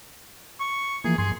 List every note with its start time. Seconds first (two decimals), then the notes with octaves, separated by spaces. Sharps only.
0.60 C#6
1.04 E3 F3 A#3 G#4
1.18 G2 G#4 C6